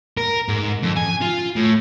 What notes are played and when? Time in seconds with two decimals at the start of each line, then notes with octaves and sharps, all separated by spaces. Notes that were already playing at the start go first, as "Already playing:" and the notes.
0.17 A#4
0.49 G#2
0.83 F2
0.97 G#5
1.22 F4
1.56 A2